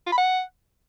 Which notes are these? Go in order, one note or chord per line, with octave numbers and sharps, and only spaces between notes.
F4
B5
F#5